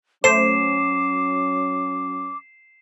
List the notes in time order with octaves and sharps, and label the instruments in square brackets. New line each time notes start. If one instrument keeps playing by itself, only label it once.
[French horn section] F#3 C#4 [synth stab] A3 C5 [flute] D6 [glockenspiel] C7 E7